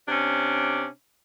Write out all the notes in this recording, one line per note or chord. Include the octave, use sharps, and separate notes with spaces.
C3 C#4 D4